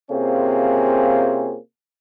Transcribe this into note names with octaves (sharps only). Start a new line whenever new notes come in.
C3 A#3 C4 C#4 F4 G#4